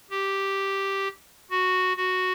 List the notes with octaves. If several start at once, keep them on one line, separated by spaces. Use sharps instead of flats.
G4
F#4
F#4